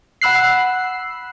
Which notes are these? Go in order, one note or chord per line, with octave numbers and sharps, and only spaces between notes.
F#5 B5 E6 F#6 C7